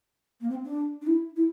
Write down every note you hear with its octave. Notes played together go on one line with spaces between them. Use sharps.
A#3
C4
D4
D4
E4
E4